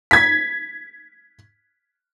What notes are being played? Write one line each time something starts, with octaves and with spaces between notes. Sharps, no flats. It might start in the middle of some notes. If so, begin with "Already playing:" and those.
G#6 B6